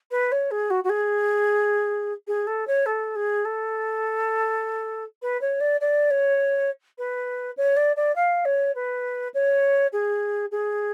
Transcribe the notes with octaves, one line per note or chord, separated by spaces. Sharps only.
B4
C#5
G#4
F#4
F#4
G#4
G#4
A4
C#5
A4
G#4
A4
B4
C#5
D5
D5
C#5
B4
C#5
D5
D5
F5
C#5
B4
C#5
G#4
G#4